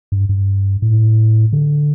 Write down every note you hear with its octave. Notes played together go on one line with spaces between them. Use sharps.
G2
G2
A2
D3